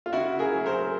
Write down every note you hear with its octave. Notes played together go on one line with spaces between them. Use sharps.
F4
C#3 E4 F#4
G#4 A#4
F#3
A#4 C5